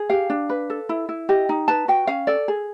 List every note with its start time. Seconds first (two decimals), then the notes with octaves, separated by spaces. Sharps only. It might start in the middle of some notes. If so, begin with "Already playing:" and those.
Already playing: G#4
0.10 G4 F5
0.30 D4
0.50 B4
0.70 A4
0.89 E4
1.09 E4
1.29 G4 D#5
1.49 D#4
1.68 B4 A5
1.88 F#4 G5
2.07 C#4 F5
2.27 A4 D5
2.48 G#4